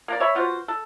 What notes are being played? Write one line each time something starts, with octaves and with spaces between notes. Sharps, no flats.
A#3 A#4 D5
C#5 E5 B5
B3 F4 F#4 C5
A4